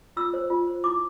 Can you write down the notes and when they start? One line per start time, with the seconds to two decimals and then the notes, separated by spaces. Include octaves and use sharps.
0.17 F4 E6
0.34 C5
0.50 F4
0.67 C5
0.84 E4 D6